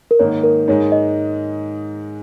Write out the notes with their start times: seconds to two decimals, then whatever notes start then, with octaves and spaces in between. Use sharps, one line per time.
0.11 A#4
0.19 G#2 D#3 A#3 D#4 C#5
0.44 A#4
0.68 G#2 G#3 D#4 C#5
0.92 D#5